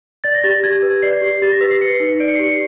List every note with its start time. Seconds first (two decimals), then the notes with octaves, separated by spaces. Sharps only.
0.24 D5 A6
0.34 A#6
0.43 G4 A6
0.64 G4 G#6
0.82 B4
1.02 D5 C7
1.22 G4
1.42 G4 A6
1.52 A#6
1.61 B4 B6
1.71 C7
1.81 B4 C#7
2.00 D#4
2.20 D5 D7
2.28 C#7
2.35 C7
2.39 G4 C#7